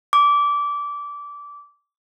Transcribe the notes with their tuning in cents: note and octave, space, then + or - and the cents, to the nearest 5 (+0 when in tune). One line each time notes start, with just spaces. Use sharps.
D6 -20